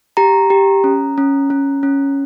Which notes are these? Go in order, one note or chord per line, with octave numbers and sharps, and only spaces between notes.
G4 A#5
G4
C#4
C#4
C#4
C#4